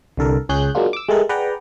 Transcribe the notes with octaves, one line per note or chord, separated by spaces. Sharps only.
C2 D3 A4 A#4
C#2 C#4 G#4 F#6 G6
F#3 G#3 A#3 D4 F4
D6 E6
G#3 A3 G4 A4 A#4
G#4 B4 D5 F#5 G5 A#5